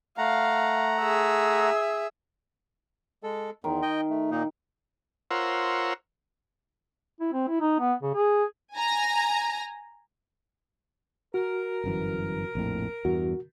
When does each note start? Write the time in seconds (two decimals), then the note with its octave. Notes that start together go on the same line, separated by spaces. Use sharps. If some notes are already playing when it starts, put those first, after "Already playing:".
0.18 A3 F5 F#5 A#5
1.00 G#4 E5
3.23 G#3 A4
3.64 E2 D#3 C6
3.82 D#5 G5
4.10 A3
4.31 A#2 A#3 D#4
5.31 F4 A#4 C5 C#5 F#5 E6
7.20 E4
7.33 C4
7.48 E4
7.60 D#4
7.79 B3
8.02 C#3
8.14 G#4
8.75 G#5 A#5
11.34 F#4 A#4
11.84 G1 F#2 E3
12.55 A#1 F2 A2
13.05 E2 G2 F#4